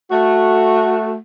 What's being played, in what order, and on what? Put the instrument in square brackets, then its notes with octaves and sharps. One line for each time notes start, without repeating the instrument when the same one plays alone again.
[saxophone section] A3 F#4